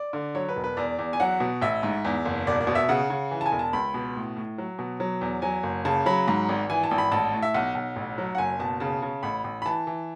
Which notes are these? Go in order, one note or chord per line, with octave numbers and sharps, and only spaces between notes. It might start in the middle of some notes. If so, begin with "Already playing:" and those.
Already playing: D5
D3
F#3 C#5
B4
E1
B4
E2 D5
E2
G#5
F#3 F#5
B2
A1 E5
G#2
E2
F#1
E1 D5
D5
B2
E5
C#3 F#5
C#3
E3
A5
G#5
E1
A5
C#2 B5
B2
A2
A2
F#3
B2
F#3
E2
F#3 G#5
F#1
C#3 A5
F#3 B5
G#2
G#1
E3 G#5
A5
G#1
B5
A1 A5
A2
E5
B1 F#5
B1
A1
F#3
F#5
F#1 G#5
B2 A5
C#3 A5
C#3
A1 B5
A1
B5
E3 A5
E3